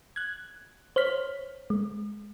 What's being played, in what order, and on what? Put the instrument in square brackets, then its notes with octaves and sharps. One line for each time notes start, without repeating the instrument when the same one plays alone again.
[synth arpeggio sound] F#6 G#6
C5 C#5 F6 B6
G#3